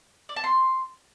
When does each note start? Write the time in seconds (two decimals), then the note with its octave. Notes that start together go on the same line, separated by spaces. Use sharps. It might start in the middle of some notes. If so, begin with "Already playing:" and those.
0.29 D5
0.36 A5
0.44 C6